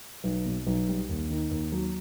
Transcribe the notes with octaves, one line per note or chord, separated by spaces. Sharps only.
B1
B2
B1
G3
D#2
D#3
D#2
F#3